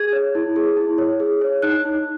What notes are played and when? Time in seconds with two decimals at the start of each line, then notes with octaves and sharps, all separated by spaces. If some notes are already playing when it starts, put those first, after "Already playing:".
Already playing: G#4 G#6
0.13 C#5
0.35 E4
0.56 G#4
0.77 E4
0.98 C#5
1.20 G#4
1.41 C#5
1.62 D#4 F#6
1.85 D#4